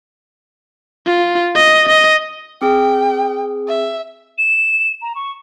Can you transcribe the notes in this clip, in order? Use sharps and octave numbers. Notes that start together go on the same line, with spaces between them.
F4
D#5
D#5
C4 G#4 G5
E5
E7
A#5
C#6